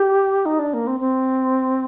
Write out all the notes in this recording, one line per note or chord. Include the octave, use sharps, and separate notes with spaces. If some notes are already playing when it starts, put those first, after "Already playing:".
Already playing: G4
D#4
D4
A#3
C4
C4